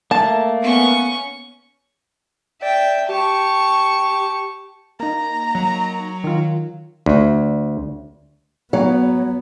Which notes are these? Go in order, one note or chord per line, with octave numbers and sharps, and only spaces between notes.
A3 A#3 A5
B3 C#4 C#6
D5 E5 G5
G4 A5 C#6
A#3 D#4 A#5
F#3
D#3 F4
D2
F#3 B3